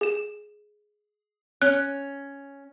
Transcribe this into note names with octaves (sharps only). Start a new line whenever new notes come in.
G#4 E7
C#4 F#6